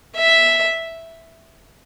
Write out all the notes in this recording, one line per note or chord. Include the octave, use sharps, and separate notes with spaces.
E5